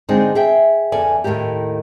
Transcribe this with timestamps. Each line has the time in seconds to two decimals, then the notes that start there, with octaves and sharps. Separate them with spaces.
0.09 D3 G#3 C4 D4 D#4
0.35 G#4 E5 G5
0.92 E2 C#3 A4 D5 G#5
1.24 D#2 A2 C3 D#3 G4